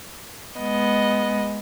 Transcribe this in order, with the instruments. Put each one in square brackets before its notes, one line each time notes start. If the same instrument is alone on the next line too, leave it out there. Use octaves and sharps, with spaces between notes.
[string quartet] G#3 B3 D#5